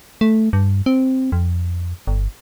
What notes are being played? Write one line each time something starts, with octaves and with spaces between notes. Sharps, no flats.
A3
G2
C4
F2
G1